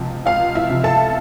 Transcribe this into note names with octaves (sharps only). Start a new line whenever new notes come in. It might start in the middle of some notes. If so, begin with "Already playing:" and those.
Already playing: C#2 C3 F3
C#2 F4 F5
E4 E5
C3 F3
A4 A5